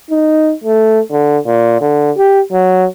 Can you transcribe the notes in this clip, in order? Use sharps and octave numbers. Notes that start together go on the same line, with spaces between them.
D#4
A3
D3
A#2
D3
G4
F#3